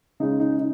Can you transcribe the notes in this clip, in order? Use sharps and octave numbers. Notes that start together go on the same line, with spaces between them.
C#3 G#3 D#4
D#4
D#4